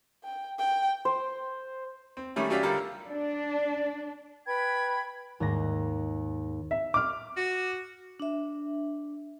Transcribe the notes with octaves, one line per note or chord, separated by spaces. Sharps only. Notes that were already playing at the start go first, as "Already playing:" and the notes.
G5
G5
C5
C4
D#3 G3 A3 C#4
F#3 C#4 G4 D5 E5 F5
D3 G3 F4 A4 A#4
D4
B4 G5 B5 G#6
D#2 G#2 A#6
E5
D6 F6
F#4
D4 E5